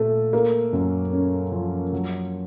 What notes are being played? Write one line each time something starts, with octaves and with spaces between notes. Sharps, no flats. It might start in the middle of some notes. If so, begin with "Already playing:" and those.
Already playing: A#2 A3 A4
A#3
F#2
C#4
F3
F#3